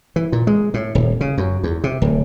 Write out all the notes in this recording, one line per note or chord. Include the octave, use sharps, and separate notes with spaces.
E3
A#2
G#3
A2
D#1
C#3
F#2
E2
C3
D1